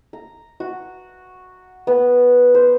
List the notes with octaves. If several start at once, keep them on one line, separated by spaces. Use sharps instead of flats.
A#5
F#4
B3
C5